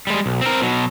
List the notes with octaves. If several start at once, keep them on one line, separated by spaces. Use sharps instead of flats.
G3 G#3
B1
C4 A#4
B2 F#3